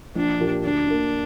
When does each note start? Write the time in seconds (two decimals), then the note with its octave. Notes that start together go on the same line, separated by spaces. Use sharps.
0.15 A#1 D4
0.40 A#2 F3 A#3 G4
0.64 D2 D4
0.87 D3 A#3